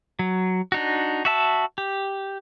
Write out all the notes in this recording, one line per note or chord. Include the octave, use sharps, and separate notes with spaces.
F#3
D4 D#4 F#4
F#4 E5 A5
G4